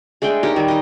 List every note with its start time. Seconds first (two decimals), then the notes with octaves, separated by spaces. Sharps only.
0.22 G#3 A3 D4 G5
0.43 D#4 G4 A#4 C#5
0.56 D#3 G3
0.68 D#4 D#5